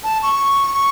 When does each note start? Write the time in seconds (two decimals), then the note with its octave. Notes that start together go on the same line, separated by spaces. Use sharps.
0.03 A5
0.22 C#6
0.74 C#6